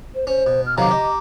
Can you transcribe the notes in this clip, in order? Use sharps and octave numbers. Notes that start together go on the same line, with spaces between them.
C5
C#4 C5
B2
F6
C3 D#3 F#3 F5 A#5 D6
G4 D#5